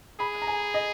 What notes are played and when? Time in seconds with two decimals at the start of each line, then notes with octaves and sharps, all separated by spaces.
0.20 G#4 B5
0.42 A#5
0.47 G#5
0.74 D#5